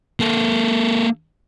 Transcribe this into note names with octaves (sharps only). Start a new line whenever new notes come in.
A#3 A4